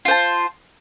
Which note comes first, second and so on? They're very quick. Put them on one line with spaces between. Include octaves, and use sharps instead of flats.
F4 C5 A5